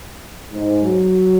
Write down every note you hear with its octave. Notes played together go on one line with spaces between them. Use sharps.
G#2
F#3